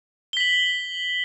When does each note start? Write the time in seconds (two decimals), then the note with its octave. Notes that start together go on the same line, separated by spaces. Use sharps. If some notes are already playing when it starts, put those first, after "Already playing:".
0.33 G7
0.37 B6
0.40 F#7